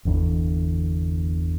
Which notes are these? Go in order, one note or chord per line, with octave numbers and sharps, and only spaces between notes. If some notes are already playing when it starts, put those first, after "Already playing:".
G1 E2 D3 E3